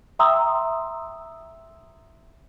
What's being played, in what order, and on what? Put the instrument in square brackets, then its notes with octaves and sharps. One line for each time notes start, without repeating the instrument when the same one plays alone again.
[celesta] E5 G5 A#5 C6 D#6 E6